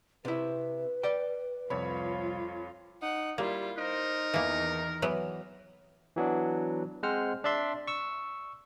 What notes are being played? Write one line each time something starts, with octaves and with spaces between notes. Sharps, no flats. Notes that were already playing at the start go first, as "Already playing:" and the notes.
C3 E4 B4
D5 G5
C2 F2 F4 C#5 B5
D#4 F#5
G3 A#3 E4 F4
D#4 A#4 C5
E2 D#3 E3 A#3
E3 F#3 B3
E3 F#3 B3 D4
G#3 C4 C5 F#5 F6
D4 D5 E5 C6
C#6 E6